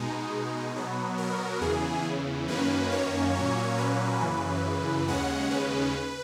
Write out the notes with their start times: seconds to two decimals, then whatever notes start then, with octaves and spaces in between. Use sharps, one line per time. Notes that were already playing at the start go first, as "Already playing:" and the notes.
Already playing: B2 G#3 D#4
0.75 B2 F#3 B3
1.18 A#4
1.61 E2 C#3 E3 G#4
2.48 F#2 D#3 A#3 C#4 B4
2.91 C#5
3.35 A#2 F#3 A#3 C#4
3.78 B4
4.21 F#2 C#3 E3
5.08 D#2 C#3 G#3 C#4 F#5
5.50 B4